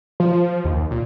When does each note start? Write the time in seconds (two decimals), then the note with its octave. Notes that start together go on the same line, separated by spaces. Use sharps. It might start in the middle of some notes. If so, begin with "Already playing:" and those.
0.20 F3
0.65 D#2
0.91 A#2